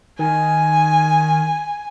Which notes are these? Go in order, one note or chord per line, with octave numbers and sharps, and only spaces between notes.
D#3 G#5